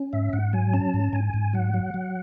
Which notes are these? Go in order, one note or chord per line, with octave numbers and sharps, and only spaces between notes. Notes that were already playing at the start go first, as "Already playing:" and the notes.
Already playing: C#4
G#2 E5
G#2 F#5
F#3 G#5
C#4 A5
G#2
G#2 G#5
G#2
F#3 F#5
F#3
F#3